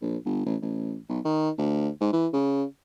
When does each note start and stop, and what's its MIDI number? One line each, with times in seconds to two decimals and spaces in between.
0.01 0.17 34
0.25 0.44 31
0.46 0.57 33
0.62 0.97 33
1.09 1.19 35
1.24 1.50 51
1.58 1.88 38
2.01 2.09 44
2.13 2.27 52
2.33 2.64 49